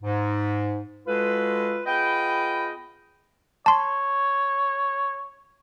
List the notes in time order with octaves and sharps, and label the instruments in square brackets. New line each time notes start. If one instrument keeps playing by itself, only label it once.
[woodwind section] G#2
G#3 F4 F#4 A4 B4
B3 F4 G#4 B4 D#5 G5
[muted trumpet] C#5 [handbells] A5 C6